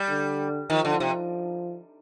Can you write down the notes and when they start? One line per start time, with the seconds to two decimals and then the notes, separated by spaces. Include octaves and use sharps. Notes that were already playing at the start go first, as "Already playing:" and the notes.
Already playing: G3
0.08 D3
0.70 D#3 F3
0.85 D3
1.00 C3